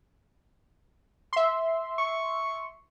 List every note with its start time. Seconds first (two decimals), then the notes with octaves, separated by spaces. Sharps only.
1.33 E5 C6
1.98 C#6